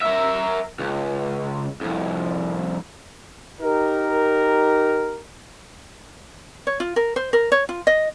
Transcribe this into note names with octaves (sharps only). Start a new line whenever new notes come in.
A#4 E5
C#2
C2 F2
D#4 G4 A#4
C#5
F4
A#4
C5
A#4
C#5
F4
D#5